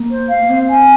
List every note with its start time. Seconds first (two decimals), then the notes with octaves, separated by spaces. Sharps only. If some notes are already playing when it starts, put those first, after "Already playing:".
Already playing: A#3
0.10 C5
0.30 F5
0.41 A#3
0.49 C4 C5
0.69 G#5